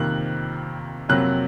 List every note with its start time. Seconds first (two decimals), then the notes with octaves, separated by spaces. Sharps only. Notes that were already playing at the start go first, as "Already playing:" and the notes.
Already playing: F2 C3 D#3 A#3 F#6
1.09 F2 C3 F#3 A#3 F#6